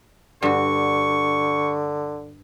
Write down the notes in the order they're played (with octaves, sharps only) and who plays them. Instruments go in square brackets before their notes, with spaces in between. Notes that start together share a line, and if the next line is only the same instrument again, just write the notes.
[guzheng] G2 F#4 [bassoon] D3 [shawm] C#6